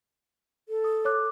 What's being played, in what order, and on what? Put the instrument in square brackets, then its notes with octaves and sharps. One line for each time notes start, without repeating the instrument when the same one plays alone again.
[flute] A4
[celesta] D#6
C#5 D6 F#6